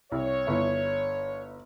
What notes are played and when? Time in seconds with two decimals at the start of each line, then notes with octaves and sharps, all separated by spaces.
0.12 C2 C#5
0.47 G1 E4